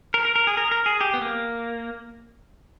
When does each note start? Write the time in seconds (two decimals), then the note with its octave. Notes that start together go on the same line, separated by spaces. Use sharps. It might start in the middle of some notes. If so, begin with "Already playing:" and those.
0.14 A#4
0.25 A#4
0.36 A#4
0.47 G#4
0.57 A#4
0.71 A#4
0.86 G#4
1.01 G4
1.14 B3
1.22 A#3